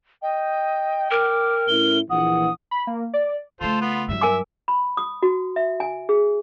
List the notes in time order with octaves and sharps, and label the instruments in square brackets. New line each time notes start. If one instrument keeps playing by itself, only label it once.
[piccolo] D#5 [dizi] G5
[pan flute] A#4 [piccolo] D6
[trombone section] A2 C#4 E4 [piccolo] G7
[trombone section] A#1 E3 [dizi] F#5 [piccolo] D#6
[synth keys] B5
A#3
D5
[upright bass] C#3 A3 [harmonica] F4 A4 C5
[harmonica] B3 F4 B4
[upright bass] G2 F#3 [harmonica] E5
[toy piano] A#4 G#5 D6
B5
D#6
F#4
E5
G#5
G#4